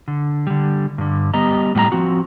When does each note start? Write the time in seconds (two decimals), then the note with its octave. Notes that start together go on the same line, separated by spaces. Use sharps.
0.08 D3
0.47 D3 G3
0.98 G2 D3
1.34 G3 B3 G4 D#5 A#5
1.75 A2 G3 F#5 A#5
1.92 F3 C4 F#4